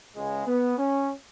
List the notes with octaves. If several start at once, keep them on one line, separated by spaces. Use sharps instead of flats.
C#2 C#3 G#3
B3
C#4